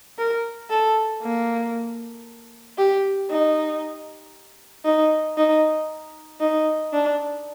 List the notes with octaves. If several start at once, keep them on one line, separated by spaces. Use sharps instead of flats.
A#4
A4
A#3
G4
D#4
D#4
D#4
D#4
D4